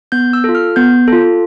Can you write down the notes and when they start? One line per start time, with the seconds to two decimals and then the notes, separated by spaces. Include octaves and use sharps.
0.12 B3 G6
0.33 E6
0.44 F4 A4
0.55 F6
0.76 B3 G6
1.08 F4 A4